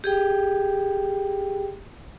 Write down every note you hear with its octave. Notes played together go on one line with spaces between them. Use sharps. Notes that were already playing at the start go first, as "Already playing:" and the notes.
G4 G#4 G5